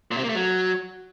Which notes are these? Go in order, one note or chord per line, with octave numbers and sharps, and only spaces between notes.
A#2
C3
A#3
A3
F#3